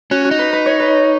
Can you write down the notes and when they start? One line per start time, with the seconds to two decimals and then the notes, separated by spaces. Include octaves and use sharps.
0.11 C#4 F#4
0.25 F#4
0.31 D#4
0.39 B4
0.53 B4
0.66 C#5
0.80 B4